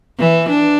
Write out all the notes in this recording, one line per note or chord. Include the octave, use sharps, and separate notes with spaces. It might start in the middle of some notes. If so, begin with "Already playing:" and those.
E3
D4